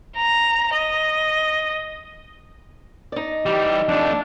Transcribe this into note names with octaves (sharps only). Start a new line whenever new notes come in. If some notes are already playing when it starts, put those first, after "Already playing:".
A#5
D#5
D#4 D5
E3 G3 G4
F2 A3 D4